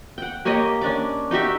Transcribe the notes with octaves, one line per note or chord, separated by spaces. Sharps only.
F#5 G5
A#3 G4 C#5 D#5
C#4 D4 D5 D6
D#4 F#4 G4 E5